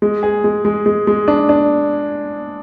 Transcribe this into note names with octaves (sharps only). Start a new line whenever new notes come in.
G#3
G#4
G#3
G#3
G#3
G#3
D4
D4